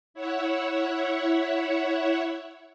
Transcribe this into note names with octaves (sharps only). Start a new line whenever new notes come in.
E4 C#5 E5 F#5